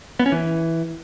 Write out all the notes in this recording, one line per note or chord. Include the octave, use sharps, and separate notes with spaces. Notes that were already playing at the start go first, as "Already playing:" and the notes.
B3
C#4
E3